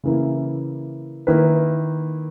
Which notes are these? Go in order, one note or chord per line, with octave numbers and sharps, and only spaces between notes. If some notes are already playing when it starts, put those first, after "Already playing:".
C#3 E3 A#3 E4
D#3 A#3 E4 B4